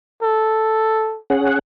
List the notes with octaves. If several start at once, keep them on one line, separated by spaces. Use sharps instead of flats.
A4
C#4 G#4 F#5